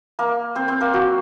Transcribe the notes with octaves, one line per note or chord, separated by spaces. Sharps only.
A#3 A#4
C4 C5
C4 C5
A#3 A#4
F#3 F#4